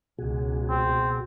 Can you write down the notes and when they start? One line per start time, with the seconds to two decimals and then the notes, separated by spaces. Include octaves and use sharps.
0.18 C#2 B2 F#4 G#4
0.70 C4